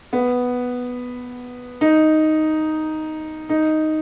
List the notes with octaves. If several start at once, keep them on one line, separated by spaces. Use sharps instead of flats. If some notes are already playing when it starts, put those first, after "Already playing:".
B3
D#4
D#4